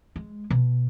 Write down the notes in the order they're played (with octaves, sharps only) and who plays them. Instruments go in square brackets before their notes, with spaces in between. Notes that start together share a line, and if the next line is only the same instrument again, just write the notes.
[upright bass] G#3
B2